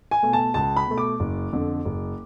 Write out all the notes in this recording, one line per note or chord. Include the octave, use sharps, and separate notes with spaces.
G#5
B2 A3
A5
C#2 A5
B5
B2 A3
D6
F#1
F2 D3
F#1